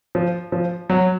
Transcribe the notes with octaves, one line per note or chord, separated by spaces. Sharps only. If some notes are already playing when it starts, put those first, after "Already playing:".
F3
F3
F#3